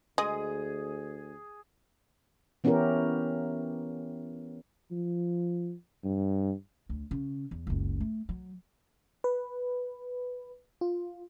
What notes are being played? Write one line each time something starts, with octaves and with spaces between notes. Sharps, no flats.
D2 G#3 G#4 D#5 D#6
E3 B3 C#4 E4 G4 A#4
F3
G2
D2
C#3
E2
F#1 C#2
A3
F#3
B4
F4